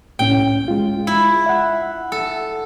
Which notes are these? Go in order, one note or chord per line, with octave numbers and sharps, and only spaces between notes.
C2 A2 C#4 G5
G#3 F4
E4
E5 F#5
A4